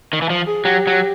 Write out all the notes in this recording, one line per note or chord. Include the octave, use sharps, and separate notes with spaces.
D#3
E3
F3
G#4
F#3 G4
F#3